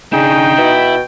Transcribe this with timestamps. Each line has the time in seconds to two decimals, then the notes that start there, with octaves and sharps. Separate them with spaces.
0.13 C#3 D4 D#4 G#4 G5
0.58 B2 E4